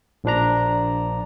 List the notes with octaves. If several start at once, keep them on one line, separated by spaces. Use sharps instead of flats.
A#1 F3 D4 A#5